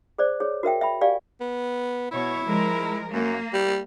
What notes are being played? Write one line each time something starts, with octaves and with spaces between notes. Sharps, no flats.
G#4 C5 D5
G#4 C#5
F#4 A#4 E5 G5
E5 G5 B5
G4 D5 F5 G#5
B3
B2 E4 C#5
F3 G#3 A#4
F#2 A#3
G3